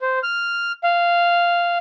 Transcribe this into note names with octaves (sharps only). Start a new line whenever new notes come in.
C5
F6
F5